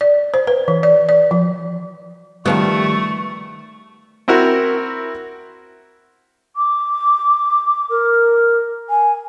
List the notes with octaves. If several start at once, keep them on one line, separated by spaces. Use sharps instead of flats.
D5
C5
B4
E3
D5
D5
F3
D#3 F3 G3 A3 B3 C#6
C4 E4 F#4 A#4
D6
A#4
G#5